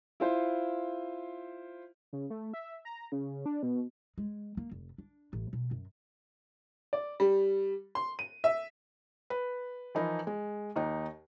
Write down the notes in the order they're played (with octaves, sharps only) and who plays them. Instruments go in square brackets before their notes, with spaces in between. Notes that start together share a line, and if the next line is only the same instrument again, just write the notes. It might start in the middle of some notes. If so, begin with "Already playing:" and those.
[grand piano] E4 F4 C5
[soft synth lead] C#3
A3
E5
A#5
C#3
D4
B2
[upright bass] G#3
A#3
F1
D4
A1
B2
F#2
[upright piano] D5
G3
C6
D#7
E5
[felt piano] B4
E3 F3 D#4 E4 A#4
G#3
D#2 D#4